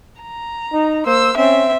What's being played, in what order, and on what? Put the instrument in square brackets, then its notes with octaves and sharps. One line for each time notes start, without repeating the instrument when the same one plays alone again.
[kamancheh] A#5
[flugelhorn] D#4
[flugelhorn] A#3 [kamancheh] C5 E6
[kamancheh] C4 E5 [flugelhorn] C#4